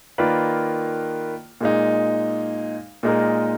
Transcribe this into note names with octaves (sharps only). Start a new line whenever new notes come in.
D#3 A#3 F4 B4 D5
A#2 G#3 D#4
A#2 G#3 D#4 A#4